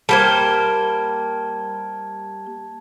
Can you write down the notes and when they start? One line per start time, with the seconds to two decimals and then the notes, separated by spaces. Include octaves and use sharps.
0.09 G3 A#3 C5 A5 G#6